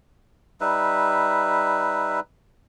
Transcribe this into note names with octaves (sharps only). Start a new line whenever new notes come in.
G3 D#4 B4 E5